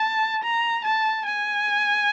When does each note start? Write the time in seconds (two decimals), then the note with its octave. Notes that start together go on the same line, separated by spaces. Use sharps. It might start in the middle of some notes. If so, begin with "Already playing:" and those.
Already playing: A5
0.43 A#5
0.84 A5
1.26 G#5